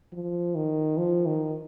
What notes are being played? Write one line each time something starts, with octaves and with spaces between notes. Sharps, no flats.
F3
D#3
F3
D#3